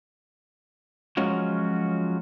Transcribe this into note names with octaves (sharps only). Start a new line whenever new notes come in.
F3 F#3 G#3 C#4 F4 F#4